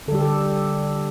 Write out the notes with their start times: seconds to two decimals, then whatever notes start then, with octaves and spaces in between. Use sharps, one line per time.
0.08 D3 A4
0.12 G3 G4
0.22 A4